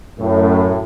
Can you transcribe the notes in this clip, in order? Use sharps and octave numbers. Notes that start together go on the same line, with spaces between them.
F#2 A2